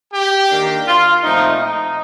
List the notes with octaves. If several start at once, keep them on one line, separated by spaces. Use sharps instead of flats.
G4
D#3 A#3 D4
F4
A#2 F3 A3 C4 D#4
D#4